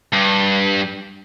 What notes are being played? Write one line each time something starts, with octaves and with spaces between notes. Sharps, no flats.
G2